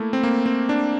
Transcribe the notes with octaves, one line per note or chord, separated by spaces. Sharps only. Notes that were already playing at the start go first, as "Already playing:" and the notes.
Already playing: A3 A#3 E4
C4
A#3
C4
D4